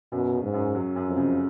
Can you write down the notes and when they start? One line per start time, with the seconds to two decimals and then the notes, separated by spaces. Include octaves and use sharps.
0.12 F#2 B2
0.32 C#3
0.43 G#2
0.54 F#2
0.75 F#3
0.96 F#2
1.07 F2
1.16 C#3